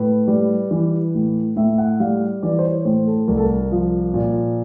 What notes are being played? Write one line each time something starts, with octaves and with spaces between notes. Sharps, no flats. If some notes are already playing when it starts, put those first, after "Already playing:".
Already playing: A2 B4
G3
E3
A2
A2 E5
F#5
G3 F5
E3 D5
C5
C#5
A2 C5
A4
C2 A#4
A4
A#4
F3
A#2